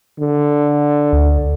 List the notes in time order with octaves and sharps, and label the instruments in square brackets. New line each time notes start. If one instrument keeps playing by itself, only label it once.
[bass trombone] D3
[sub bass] D2